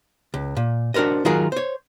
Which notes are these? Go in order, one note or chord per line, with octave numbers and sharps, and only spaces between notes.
C#2
A#2
D4 F#4 A#4 C5 D#5
D#3 F#3 F4 F#4 G#4 A#4
C5 C#5